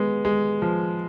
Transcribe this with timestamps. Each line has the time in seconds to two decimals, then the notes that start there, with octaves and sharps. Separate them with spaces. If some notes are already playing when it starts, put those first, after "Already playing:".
Already playing: G#3 B3
0.25 G#3
0.62 F3